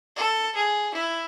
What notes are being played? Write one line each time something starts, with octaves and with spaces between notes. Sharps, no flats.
A4
G#4
E4